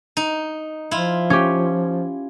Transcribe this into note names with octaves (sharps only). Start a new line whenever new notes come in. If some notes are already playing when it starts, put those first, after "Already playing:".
D#4
F3 E4 F4
C#4 G4